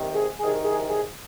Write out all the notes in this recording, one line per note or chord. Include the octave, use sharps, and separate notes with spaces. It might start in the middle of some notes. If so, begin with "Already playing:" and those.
Already playing: C2 C3 D#3
G#4
C2 C3 D#3 G#4
G#4
G#4